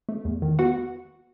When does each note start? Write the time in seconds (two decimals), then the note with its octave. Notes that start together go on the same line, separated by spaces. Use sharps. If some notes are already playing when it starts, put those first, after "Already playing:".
0.09 A3
0.25 E2
0.42 D#3
0.59 B3 F#4 F#5